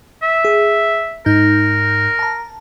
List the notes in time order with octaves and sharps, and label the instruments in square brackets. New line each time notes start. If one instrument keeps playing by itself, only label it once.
[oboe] E5
[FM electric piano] G#4
[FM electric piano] G#2 D#4 G6 [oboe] A#4
[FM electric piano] A5 A#5